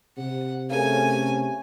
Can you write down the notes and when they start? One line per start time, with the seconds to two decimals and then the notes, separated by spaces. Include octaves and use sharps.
0.18 C3 F#5
0.70 A3 C#4 G#4 A#4 F5 G#5